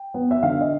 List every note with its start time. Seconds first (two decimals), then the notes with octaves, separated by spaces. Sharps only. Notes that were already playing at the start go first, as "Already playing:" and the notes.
Already playing: G5
0.14 B3
0.31 E5
0.43 D3 F5
0.61 D#5